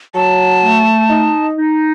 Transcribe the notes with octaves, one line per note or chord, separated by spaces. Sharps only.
F#3 A5
A3
D#4
D#4